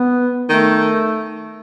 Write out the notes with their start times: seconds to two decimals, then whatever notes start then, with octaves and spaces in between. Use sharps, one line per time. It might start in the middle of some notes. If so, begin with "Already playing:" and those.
Already playing: B3
0.49 D#3 A3